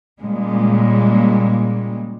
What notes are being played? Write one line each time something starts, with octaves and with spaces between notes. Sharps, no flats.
A#2 C#3 G3 G#3